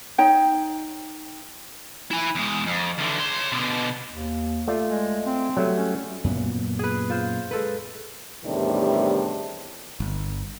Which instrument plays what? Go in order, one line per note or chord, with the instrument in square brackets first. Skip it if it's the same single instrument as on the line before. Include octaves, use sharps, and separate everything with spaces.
[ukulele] D#4 C#5 G5
[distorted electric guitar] E4 G#5
E2 G#3
F2
E2 D3
C#5 C6
B2 D3
[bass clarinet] D#2
[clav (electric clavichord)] A3 F4 D5
[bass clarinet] G#3
C4
[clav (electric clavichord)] F#3 G3 A3
[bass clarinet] C#4
[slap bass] F#2 A#2 B3
[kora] G#4 B4
F4 C5
G#3 A4 B4
[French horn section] E2 A2 C3 D#3 G3 D4
[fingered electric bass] G1